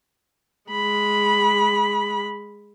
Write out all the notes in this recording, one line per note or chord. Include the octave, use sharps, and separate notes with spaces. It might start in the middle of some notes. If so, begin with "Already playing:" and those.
G#3 B5